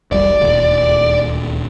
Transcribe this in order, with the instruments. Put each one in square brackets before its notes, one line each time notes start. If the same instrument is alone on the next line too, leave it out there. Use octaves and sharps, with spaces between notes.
[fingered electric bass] E1 B1 G3 [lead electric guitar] D5
[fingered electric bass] D#1 D2